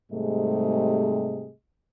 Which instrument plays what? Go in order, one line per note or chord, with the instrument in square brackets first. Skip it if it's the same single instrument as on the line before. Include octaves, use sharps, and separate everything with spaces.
[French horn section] G#2 C3 G3 A3 G#4 D#5